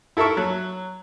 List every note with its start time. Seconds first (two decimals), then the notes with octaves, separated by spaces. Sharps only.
0.17 E4 A4 A#4 E5 C#6
0.37 F#3